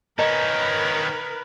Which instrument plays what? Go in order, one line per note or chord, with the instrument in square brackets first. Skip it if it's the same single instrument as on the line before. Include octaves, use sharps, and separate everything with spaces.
[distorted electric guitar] D#3 C#4 [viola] A#4 B4 [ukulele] D#5 A#5